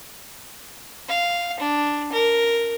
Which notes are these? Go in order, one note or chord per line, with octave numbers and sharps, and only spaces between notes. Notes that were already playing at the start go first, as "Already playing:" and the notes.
F5
D4
A#4